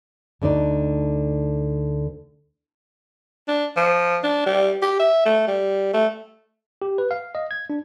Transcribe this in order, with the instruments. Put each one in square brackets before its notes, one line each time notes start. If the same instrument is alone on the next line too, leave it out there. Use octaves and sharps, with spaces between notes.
[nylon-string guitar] D2 D3 D#4 D5
[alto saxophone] D4
F3
D4
G3
G4
E5
A3
G3
A3
[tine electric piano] G4
B4
F5
D#5
G#6
D4